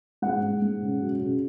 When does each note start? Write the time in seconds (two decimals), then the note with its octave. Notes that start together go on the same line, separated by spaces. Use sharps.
0.22 G#2 F#5
0.43 G#2
0.62 G#2
0.81 C#3
1.01 F#2
1.20 C#3